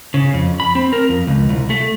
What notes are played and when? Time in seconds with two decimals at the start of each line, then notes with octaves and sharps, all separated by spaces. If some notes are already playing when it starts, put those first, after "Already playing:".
0.14 C#3
0.34 F2
0.60 B5
0.75 C4
0.93 A#4
1.09 F2
1.27 C#2
1.49 C2
1.70 A3